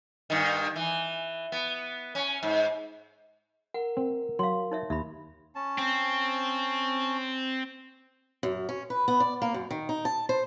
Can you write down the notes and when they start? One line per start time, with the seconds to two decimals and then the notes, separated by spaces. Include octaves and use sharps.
0.30 G2 D#3
0.76 E3
1.52 B3
2.15 C#4
2.43 G#2
3.74 A#4 F#5
3.97 C4
4.39 F#3 F5 C6
4.71 D#4 C#5 E5
4.90 D#2 E5 B5
5.55 C#4 A5
5.78 C4
8.43 F#2
8.69 C#4
8.90 B4
9.08 B3
9.20 D5
9.42 A#3
9.54 F#2
9.71 D#3
9.89 D#4
10.05 A5
10.29 C5